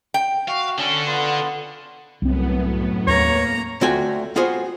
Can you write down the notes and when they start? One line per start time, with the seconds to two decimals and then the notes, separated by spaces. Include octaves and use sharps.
0.14 G5
0.48 F#4 F5
0.78 D3 C#4 A4
1.06 B3 F4
2.22 C2 F#2 A2 B3 C4
3.07 D#2 A#3 C#5 A#5
3.81 D2 A3 F4 F#4 G5 G#5
4.36 B3 F4 F#4 G#4 C5